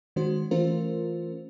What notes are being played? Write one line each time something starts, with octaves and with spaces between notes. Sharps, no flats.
D#3 G#3 C#4 F#4 C5
E3 A3 C#4 F4 A#4 C5